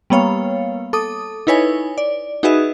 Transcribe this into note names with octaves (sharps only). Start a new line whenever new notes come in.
G3 A#3 B3 C#5 F5
A4 D6 D#6
D#4 E4 B4 C#5 G#5
D5
D#4 F#4 G#4 B4 D#5 E5